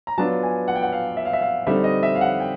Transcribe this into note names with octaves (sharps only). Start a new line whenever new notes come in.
A#5
F#3 B3 D4 F4 A5
G#5
F#5
G5
F#5
F5
E5
F5
E5
F5
D3 G3 C4 D#4 E5
D#5
E5
F5
F#5
G5